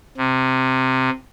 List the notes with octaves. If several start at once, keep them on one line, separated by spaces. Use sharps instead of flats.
C3